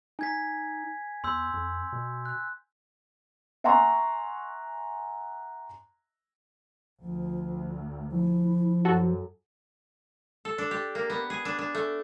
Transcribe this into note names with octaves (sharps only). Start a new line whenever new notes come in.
D#4 G#5 G#6 B6
E2 C6 E6 G6
F2
B2
F#6
E5 F#5 G#5 A#5 C6 C#6
D2 F3
F3 E4
F#2 F#4 A4
A4
D4
G4
A#3
B3
G#4
D4
D4
A3